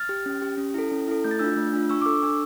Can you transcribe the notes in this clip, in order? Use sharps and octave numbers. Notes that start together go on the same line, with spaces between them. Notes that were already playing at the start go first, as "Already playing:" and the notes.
Already playing: F6 A6
G4
C#4
G4
C#4
E4 A4
C#4
E4 A4
A3 G6
A6
D4 F4 E6 G6
A3
D4 F4
D4 C#6 E6
D6
A4 C#6 E6
D4 C#6 E6